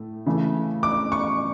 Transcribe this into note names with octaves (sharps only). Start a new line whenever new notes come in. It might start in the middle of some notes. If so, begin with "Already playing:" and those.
Already playing: A2 A3
C#3 E3 A3
D6
C#6